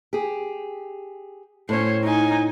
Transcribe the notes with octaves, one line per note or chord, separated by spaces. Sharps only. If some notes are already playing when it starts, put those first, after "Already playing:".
G4 G#4
A2 C#4 C5 C#5
D#4 G#5